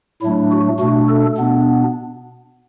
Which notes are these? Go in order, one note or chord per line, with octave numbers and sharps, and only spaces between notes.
A2 F#3 A3 D4 E4
F#4
B2 A3 D4 F#4
A4
B2 B3 D4